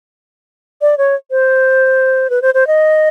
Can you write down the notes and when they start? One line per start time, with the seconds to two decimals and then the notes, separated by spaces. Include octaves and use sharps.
0.82 D5
0.98 C#5
1.31 C5
2.30 B4
2.42 C5
2.54 C5
2.67 D#5